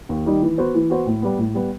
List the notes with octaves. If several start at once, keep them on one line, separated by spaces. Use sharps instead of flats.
D#2
D#3 G3 D#4
E3
B3 F#4 C5
E3
B3 F#4 C5
A2
G3 B3
A2
G3 B3